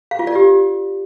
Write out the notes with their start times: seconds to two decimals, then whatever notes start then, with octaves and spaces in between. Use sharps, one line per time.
0.11 F5
0.19 F4
0.27 D5
0.35 G4